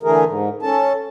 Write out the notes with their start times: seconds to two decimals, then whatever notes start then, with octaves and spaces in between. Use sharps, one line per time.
0.03 D3 E3 A3 G#4 A#4
0.25 G#2
0.63 C#4 A4 A5